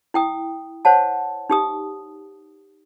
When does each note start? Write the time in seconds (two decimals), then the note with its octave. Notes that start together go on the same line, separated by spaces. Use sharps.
0.14 E4 G5 D#6
0.85 C5 C#5 F#5 A5
1.50 D#4 G4 D#6